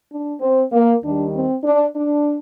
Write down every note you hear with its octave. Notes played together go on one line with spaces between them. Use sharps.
D4
C4
A#3
D#2 D#3 G3 D4
C4
D4
D4